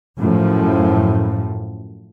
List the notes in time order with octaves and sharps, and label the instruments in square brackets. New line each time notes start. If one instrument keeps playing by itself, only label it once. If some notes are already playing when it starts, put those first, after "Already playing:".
[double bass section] F#2 A2 F3